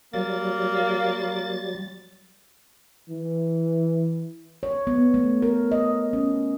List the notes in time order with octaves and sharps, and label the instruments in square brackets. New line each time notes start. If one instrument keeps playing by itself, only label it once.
[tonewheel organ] F#3 G3 A6 [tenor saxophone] A#3
[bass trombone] E3
[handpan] C#5
B3
A3
A#4
D#5
C#4